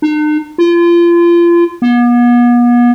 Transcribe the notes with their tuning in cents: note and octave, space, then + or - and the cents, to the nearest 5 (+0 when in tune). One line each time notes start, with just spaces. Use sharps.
D#4 -45
F4 -30
B3 -40